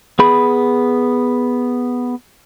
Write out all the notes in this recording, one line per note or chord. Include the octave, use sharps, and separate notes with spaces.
B3 G#4 B5